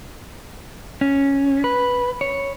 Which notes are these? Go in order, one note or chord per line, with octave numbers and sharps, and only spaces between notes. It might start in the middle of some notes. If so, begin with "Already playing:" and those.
C#4
B4
C#5